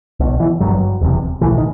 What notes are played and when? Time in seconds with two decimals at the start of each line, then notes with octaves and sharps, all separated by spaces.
0.20 B1 B2
0.40 E3
0.60 G1 G2 F#3
1.01 E1 E2 C3
1.41 B1 A2 E3
1.58 D#3